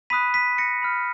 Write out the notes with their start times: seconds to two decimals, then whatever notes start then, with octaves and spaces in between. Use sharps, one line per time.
0.10 B5 D#6 F#6 B6 D#7
0.34 B6 D#7
0.58 A#6 C#7
0.82 B5 F6